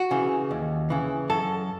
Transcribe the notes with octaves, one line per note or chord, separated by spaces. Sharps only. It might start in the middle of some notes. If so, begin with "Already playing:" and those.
Already playing: F#4
C#3 E3
D#2
C#3 E3
F#2 A4